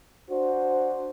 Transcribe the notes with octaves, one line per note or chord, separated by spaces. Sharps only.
D4 F#4 C5